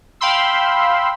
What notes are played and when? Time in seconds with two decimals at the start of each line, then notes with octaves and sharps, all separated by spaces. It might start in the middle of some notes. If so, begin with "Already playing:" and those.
0.21 F5 G5 B5 C6 E6